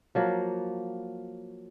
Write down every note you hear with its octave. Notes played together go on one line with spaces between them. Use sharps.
F3 F#3 A#3